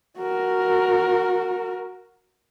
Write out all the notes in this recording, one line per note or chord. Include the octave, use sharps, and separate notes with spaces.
F#4 A#4